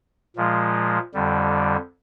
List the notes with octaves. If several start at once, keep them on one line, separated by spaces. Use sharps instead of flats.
A#2 F3 G#3
F2 D3 G3